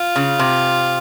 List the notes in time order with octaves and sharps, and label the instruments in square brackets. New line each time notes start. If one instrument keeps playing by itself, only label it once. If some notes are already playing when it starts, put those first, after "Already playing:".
Already playing: [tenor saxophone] F4
[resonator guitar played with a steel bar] C#3
C3